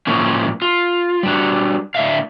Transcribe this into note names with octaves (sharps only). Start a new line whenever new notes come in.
A2 F3 A#3 C#4
F4
G3 D4 F#4
A2 D3 B4 E5 F5